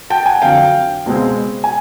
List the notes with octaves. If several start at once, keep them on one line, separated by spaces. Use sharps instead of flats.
G5 A5
F#5 G#5
F2 D3 F#3 F5 G5
C#2 B2 G#3 C4
G#5